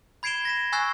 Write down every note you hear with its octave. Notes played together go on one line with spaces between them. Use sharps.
B5 G#6 C7 D7 E7 G7
A#6 B6 E7
G#5 C#6 E6 F#6 A6 C7